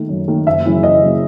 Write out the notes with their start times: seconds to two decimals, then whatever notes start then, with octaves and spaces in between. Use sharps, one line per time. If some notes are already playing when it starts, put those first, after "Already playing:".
Already playing: D#3 A3
0.09 F#2
0.28 D#3 A3
0.46 F#1 E5
0.65 F#2 C#3 E3
0.83 F#1 D#5
1.02 F#2 C#3 E3